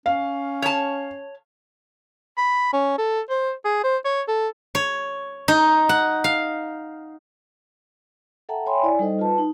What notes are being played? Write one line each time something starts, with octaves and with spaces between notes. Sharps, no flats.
C#4 F5
C#5 A5
B5
C#4
A4
C5
G#4
C5
C#5
A4
C#5
D#4
F#5
F5
A4 E5 F#5 G5 A5 A#5
C#5 E5 G5 G#5 B5 C6
E4 D5 G#5
G3 D#4 A4 C5 D#5
F4 B4 A5
D#4